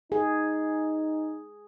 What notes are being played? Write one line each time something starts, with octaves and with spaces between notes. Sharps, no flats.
D#4 G#4